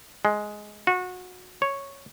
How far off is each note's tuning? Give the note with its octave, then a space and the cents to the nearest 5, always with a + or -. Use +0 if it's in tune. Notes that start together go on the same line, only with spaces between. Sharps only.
G#3 +10
F#4 -25
C#5 -5